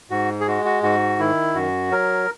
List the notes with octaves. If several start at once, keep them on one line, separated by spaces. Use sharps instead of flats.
G#2 F#4
G#4
G#3 F#4
F#4
G#2 F#4
D#3 E4
F#2 F#4
F#3 A#4